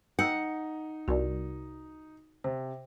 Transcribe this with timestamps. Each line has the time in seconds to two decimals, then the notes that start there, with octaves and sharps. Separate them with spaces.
0.19 D#4 F#5 G5 E6 G6
1.08 C2 F#4 A#4 D5
2.44 C3 C5